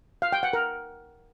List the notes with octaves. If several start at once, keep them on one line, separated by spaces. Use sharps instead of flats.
F5
G5
F#5
A#4